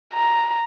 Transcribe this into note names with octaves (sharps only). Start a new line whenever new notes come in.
A#5